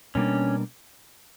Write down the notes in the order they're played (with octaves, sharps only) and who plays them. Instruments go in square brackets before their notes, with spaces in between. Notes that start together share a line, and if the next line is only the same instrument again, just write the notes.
[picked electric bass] B2 G3 A#3 D4 [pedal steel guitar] C#4